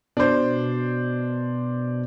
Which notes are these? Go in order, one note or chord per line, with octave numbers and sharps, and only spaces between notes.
B2 D4 C5